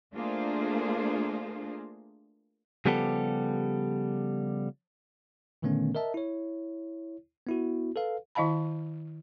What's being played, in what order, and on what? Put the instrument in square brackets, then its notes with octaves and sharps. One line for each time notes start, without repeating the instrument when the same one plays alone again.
[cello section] A3 A#3 D4 F4 G#4 C5
[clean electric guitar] C#3 F3 G3 B3 G4 A4
[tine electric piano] A#2 D3 D#3 A3 B3 C#4
A#4 D#5 E5 A5
E4 C#5
B3 E4 F#4
A4 B4 F5
[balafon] D#3 E4 D#5 F5 A5 B5